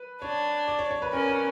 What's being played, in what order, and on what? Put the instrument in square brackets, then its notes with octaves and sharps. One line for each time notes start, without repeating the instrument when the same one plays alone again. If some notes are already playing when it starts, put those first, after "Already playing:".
Already playing: [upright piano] B4
[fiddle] D4 [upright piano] C#5
[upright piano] D5
C#5
C#5
B4
[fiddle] C#4 [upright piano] A#4
[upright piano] A#4